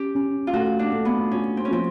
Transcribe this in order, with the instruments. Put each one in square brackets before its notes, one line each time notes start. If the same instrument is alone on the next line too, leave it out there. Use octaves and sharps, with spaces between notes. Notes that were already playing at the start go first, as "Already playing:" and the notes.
Already playing: [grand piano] C#4 [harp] G4
[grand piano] C#4
[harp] F4
[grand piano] A3 [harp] F#4
[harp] D4
[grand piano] A3
[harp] B3
[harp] C#4 [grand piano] F4
[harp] C4
C#4
[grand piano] F3 [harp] C4